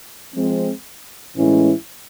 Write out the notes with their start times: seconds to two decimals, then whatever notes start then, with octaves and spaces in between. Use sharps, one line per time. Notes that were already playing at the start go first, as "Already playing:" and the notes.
0.35 F3 G#3 C4
1.36 A2 E3 G#3 C#4 E4